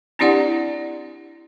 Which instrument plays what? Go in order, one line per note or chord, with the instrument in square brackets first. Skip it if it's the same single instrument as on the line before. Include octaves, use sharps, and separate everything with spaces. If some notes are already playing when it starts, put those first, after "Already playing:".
[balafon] C4 D4 E4 G4 D5 F#5